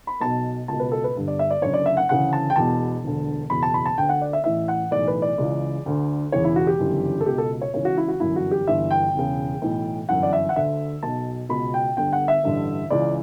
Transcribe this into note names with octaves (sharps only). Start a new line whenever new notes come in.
B5
B1 B2 A5
C#2 B2 A5
B4
A4
B4
G1 G2 D3
D5
E5
D5
F#1 F#2 D3 C#5
D5
E5
F#5
D2 C#3 E3 F#5
A5
G5
E1 E2 B2 A5
E1 D2 D3
F#1 E2 B2 B5
A5
B5
A5
D2 D3 G5
F#5
D5
E5
A1 A2 E3 E5
F#5
B1 A2 E3 D5
B4
D5
C#2 C#3 E3
D2 D3
E1 E2 C#3 E3 C#5
E4
F#4
G4
G1 F#2 C#3 E3
A4
C#2 B2 G4
A4
C#5
C#2 C#3 E3 C#5
F#4
E4
F#4
G1 F#2 E3 E4
F#4
G4
G1 G2 E3 E5
G5
E1 E2 C#3
B1 A2 E3
G1 F#2 E3 F#5
D5
E5
F#5
D2 D3 E5
B1 B2 A5
C#2 B2 B5
G5
G1 G2 D3 G5
F#5
E5
A1 G2 D3
C#2 C#3 E3 D5